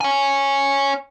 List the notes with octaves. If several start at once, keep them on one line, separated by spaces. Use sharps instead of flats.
C#5 G#5